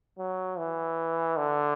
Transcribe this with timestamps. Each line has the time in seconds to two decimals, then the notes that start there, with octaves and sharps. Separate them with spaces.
0.19 F#3
0.58 E3
1.37 D3